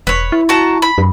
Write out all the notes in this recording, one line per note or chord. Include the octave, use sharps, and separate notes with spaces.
E1 B4 C#5
E4
F#4 A5 A#5
B5
F#2